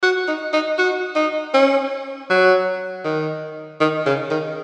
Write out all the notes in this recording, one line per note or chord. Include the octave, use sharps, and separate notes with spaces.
F#4
D#4
D#4
F#4
D#4
C#4
F#3
D#3
D#3
C#3
D#3